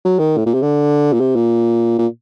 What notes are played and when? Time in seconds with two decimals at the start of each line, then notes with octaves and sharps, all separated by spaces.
0.05 F#3
0.19 D#3
0.37 A2
0.46 A#2
0.54 C3
0.62 D3
1.13 A#2
1.20 C3
1.35 A#2
1.99 A#2